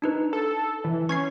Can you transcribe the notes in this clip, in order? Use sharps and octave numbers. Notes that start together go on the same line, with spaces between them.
D4 D#4 B4
A4
E3
C#4 C#6 G#6 C7